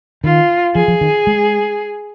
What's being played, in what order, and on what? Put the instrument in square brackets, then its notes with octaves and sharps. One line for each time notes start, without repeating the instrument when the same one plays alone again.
[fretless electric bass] D#3 [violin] F4
[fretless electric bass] F3 [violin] G#4
[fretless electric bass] F3
D#3
G#3